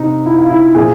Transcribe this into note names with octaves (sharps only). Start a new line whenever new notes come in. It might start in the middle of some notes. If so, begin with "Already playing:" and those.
Already playing: C3 D#4
E4
F4
E4
A#2 F3 G#4